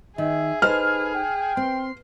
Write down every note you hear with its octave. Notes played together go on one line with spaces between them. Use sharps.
D#3 G#4 E5
D#4 A4 B4 C5 F6
G5
C4 C6